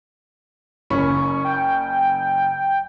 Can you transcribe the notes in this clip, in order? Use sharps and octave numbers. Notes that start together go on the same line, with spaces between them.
F#1 C#4 B5 C#6
G5